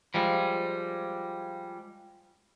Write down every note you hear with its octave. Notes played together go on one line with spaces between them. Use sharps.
F3 G3 G#3